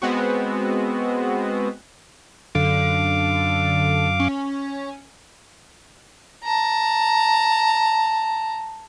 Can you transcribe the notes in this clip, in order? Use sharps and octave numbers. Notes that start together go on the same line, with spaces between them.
G#3 B3 C4 F#4
F#2 D3 F5 D6
C#4
A5 A#5